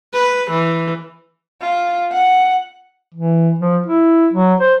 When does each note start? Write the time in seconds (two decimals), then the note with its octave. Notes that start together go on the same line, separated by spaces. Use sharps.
0.14 B4
0.50 E3
1.62 F4
2.12 F#5
3.14 E3
3.59 F3
3.86 E4
4.33 F#3
4.60 C5